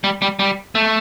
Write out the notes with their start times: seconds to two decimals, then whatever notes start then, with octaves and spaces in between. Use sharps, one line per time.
0.04 G3
0.22 G3
0.39 G3
0.75 A3